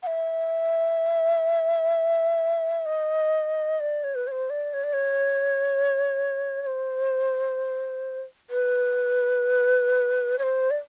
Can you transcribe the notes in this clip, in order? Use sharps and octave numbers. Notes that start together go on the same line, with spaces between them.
F#5
E5
D#5
D5
C#5
B4
C#5
C5
D5
C#5
D5
C#5
C#5
C5
B4
C#5
C5
D5